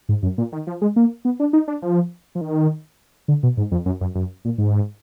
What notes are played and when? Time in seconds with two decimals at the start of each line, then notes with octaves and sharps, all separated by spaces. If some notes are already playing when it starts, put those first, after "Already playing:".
0.09 G#2
0.23 F#2
0.38 A#2
0.52 D#3
0.67 F3
0.82 G#3
0.96 A#3
1.25 B3
1.40 D4
1.53 D#4
1.68 D4
1.82 F3
2.35 F3
2.41 D#3
3.28 D3
3.43 B2
3.57 G#2
3.72 F2
3.86 F#2
4.01 F#2
4.15 F#2
4.45 A#2
4.58 G#2